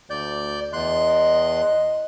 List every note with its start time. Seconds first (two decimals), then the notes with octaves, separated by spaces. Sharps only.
0.10 D2 D5 G6
0.73 E2 D#5 C6 F#6